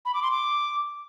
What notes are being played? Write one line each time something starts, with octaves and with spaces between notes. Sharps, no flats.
B5
D6
C6
D6